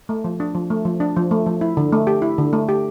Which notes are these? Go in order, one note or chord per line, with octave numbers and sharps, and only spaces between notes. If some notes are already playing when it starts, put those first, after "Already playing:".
A3
F3
D4
F3
A3
F3
D4
F3
A3
F3
E4
D3
A3
G4
E4
D3
A3
G4